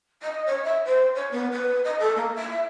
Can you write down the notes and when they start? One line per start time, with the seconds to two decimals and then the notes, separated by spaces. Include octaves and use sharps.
0.23 D#5
0.46 C#5
0.64 E5
0.85 C5
1.15 C#5
1.31 B3
1.51 B4
1.84 D#5
1.99 A4
2.16 A#3
2.36 E5